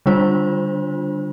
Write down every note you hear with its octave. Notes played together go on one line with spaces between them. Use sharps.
D3 G3 D4 F4 C5